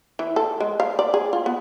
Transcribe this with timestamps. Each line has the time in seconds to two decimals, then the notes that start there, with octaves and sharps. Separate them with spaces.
0.19 E3
0.36 A4
0.60 G#3
0.80 F5
0.99 D5
1.14 G#4
1.33 F4
1.46 B3